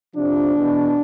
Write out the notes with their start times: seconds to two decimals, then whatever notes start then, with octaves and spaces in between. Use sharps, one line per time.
0.15 F2 C3 F3 D4
0.54 E2 B2